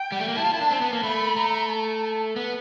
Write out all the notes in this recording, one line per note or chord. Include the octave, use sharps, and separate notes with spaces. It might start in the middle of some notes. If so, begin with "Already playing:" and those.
Already playing: G5
G3
A3
A#3
E4 A5
F4
E4
D4
C4
B3
A#3
A3 B5
A3 A#5
A5
B3